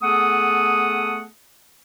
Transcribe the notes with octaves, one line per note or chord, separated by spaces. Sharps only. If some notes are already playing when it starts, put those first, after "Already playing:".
A3 B3 G#4 A4 F#5 D#6